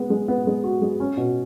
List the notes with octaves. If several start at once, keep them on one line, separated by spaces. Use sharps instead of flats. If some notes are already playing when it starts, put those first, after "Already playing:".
Already playing: G#3 B3
G#3
B3
G#3
F#4
G#3
C#4
B2